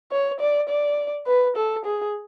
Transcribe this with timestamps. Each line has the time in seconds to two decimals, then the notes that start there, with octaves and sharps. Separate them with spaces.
0.12 C#5
0.40 D5
0.69 D5
1.27 B4
1.56 A4
1.85 G#4